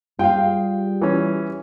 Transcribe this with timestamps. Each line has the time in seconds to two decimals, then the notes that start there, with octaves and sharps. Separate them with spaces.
0.19 G3 F4 G#4 F5 G5
1.01 E3 C#4